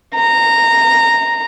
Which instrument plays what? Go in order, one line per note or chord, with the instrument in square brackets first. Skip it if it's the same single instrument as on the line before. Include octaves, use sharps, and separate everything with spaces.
[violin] A#5